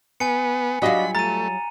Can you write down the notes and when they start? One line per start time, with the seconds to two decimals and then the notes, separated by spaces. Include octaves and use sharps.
0.20 B3 G#5 C#7
0.82 F#3 G3 D4 F4 F#4 D#5 B5
1.15 A3 A#5 A6 D#7